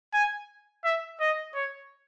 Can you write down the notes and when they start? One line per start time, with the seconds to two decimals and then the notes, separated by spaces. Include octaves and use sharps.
0.14 G#5
0.84 E5
1.20 D#5
1.55 C#5